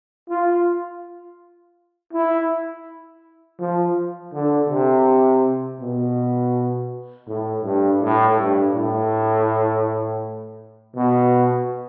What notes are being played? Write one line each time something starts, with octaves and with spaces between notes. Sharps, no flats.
F4
E4
F3
D3
C3
B2
A2
G2
A2
G2
A2
B2